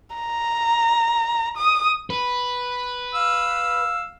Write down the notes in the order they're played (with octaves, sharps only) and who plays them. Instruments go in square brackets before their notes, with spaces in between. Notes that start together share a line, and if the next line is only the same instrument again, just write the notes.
[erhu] A#5
D#6
[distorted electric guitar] B4
[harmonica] F5 E6